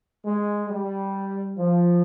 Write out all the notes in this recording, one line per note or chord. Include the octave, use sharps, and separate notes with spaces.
G#3
G3
F3